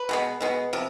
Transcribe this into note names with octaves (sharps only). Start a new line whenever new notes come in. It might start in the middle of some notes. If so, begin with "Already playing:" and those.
Already playing: B4
B2 G#3 B3
B2 G#3 B3
C3 F3